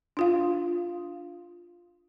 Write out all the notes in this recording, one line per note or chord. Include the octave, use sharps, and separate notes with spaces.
D4 F4 F5